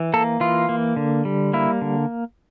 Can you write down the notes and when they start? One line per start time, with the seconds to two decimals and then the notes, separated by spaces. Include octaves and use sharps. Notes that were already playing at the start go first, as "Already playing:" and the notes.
Already playing: E3
0.14 A#3 A4
0.40 E3 F4
0.69 A#3
0.96 D3
1.25 G3
1.53 A#3 E4
1.82 D3